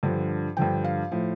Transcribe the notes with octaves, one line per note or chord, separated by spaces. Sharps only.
G2 D3 F3
G2 D3 F3 G5
F5
A2 F3